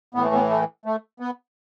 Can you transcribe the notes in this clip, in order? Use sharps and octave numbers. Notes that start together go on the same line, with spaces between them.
A2 E3 B3
A3
B3
A3
A3
B3